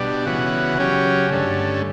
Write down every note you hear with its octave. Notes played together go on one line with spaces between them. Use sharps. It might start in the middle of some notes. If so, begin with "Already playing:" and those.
Already playing: B2 G3 D4
C#3 E3 B3 F#4
C#3 F#3 C#4 G4
G2 D3 A3 C#4